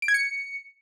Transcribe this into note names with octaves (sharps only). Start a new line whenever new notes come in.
D7
G#6
C#7